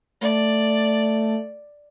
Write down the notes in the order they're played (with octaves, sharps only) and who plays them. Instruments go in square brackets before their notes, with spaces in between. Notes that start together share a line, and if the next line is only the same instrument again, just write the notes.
[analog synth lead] A3 [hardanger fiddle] D5